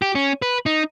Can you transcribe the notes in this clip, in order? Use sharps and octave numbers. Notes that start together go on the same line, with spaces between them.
G4
C#4
B4
D#4